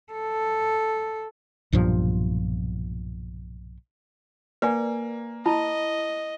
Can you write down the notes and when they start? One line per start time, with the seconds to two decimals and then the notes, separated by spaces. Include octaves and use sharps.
0.12 A4
1.72 B1 G2 A#2 F3
4.62 A#3 B4 D5 G#5
5.46 E4 D#5 A5 B5